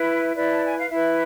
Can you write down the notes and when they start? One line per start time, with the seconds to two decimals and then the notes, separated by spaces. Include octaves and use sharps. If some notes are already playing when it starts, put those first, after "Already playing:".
Already playing: E4 B4
0.36 E4 B4 D5
0.51 A5
0.64 G#5
0.77 F5
0.89 E4 B4 E5